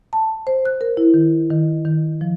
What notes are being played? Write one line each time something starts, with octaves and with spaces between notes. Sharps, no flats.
A5
C5
F#6
A#4
E4
D#3
D#3
D#3
F3